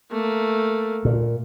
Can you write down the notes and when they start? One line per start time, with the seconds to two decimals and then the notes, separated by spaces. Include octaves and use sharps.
0.11 A3 A#3
1.05 A#2